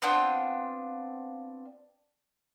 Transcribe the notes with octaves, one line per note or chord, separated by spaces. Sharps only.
B3 C4 D4 F4